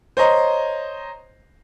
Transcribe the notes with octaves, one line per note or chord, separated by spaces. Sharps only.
C5 C#5 D#5 A#5